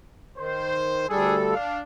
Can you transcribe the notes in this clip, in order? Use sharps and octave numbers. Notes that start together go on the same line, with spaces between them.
D#3 C5
D2 G3 D4 G#4 A4
D4 F5